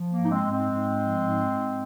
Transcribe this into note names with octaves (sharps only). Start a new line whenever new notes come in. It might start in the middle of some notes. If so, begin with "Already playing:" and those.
Already playing: F3
A#3
G#2
D#4
G#3 C4
G#2
G#3 C4
G#2
F3
G#2
G#2